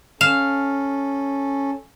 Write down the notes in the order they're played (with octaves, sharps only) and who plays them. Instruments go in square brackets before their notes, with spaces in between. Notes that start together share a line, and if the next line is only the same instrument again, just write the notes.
[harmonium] C#4 A4 [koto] F5